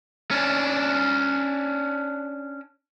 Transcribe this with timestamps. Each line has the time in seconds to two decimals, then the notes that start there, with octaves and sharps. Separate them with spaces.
0.31 C#4 D4